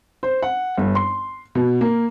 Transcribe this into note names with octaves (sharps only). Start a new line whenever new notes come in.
C5
F#5
G1
C6
B2
A#3